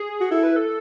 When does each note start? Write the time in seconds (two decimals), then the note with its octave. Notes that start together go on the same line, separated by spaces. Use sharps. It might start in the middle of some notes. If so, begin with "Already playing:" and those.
Already playing: G#4
0.21 F#4
0.31 E4 A4
0.43 B4
0.56 A4